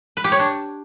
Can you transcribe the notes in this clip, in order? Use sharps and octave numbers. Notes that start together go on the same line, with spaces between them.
B4
G4
C#5
D4